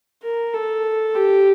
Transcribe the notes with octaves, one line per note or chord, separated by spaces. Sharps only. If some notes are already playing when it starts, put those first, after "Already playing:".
A#4
A4
G4